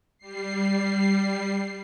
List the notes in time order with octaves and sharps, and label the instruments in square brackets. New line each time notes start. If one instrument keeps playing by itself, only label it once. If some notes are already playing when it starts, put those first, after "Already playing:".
[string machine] G3 C7